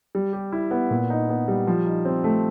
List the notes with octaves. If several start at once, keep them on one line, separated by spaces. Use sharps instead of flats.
G3
G4
E4
B3
A#2
D#4
B3
G3
F3
D#4
C4
A3